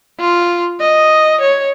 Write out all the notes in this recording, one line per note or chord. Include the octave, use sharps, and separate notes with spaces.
F4
D#5
C#5